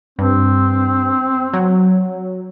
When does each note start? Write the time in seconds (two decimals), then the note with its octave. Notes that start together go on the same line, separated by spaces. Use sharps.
0.19 G2 C4
1.54 F#3